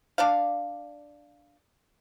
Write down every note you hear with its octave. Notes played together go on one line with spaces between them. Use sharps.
D4 D5 F5